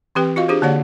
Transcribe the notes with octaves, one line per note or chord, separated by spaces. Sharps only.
E3 C4 G4 B4 G5
F4 F#4 D#5 F5
D4 G4 G#4 C5
D3 A#3 F#4 C#5 D5 F#5